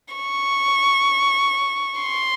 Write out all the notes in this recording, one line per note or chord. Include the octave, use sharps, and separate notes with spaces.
C#6
C6